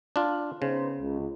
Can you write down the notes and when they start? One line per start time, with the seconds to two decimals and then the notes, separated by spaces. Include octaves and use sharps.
0.16 D4 F4
0.62 C#3 B3 D#4 C5
1.00 C#2